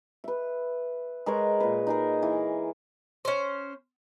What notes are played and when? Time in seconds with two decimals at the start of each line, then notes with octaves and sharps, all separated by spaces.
0.24 B4 E5
1.26 G#3 A#4 B4 C#5
1.60 A#2 B4
1.87 D#4 G#4 A#4
2.22 E3
3.25 C#4 C5